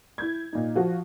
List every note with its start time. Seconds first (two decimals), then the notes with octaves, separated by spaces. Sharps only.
0.18 E4 G6 G#6
0.53 A#2 D#4
0.76 F3 F#4